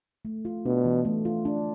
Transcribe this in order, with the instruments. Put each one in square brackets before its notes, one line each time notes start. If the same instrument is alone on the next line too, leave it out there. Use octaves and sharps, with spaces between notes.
[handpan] A3
F4
[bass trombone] B2 [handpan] D4
[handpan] E3
A3
F4
D4